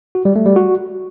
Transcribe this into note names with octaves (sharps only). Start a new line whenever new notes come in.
F#4
G3
A3
G3
F#4